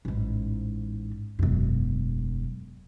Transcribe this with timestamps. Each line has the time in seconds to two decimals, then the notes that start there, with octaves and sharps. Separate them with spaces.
0.05 A1 G#2
1.39 E1 F#2